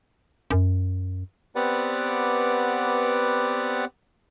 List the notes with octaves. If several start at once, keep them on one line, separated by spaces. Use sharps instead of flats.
F#2
B3 C4 G4 B4 D5 F#5